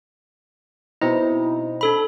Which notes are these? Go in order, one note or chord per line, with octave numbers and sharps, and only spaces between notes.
B2 C4 D#4 E4
D4 A4 B5